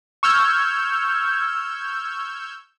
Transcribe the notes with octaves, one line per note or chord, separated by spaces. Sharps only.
C#6 E6 F6 G6 G#6